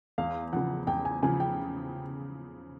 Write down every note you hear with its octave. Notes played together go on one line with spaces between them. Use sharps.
E2 F5
C#3 F3 F#5
E2 G5
G#5
C#3 F3 G#5
G5